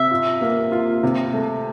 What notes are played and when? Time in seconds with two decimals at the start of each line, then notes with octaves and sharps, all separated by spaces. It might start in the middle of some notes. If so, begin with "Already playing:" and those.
Already playing: C3 E5
0.11 F4
0.41 A#3
0.72 F4
1.03 C3
1.33 A3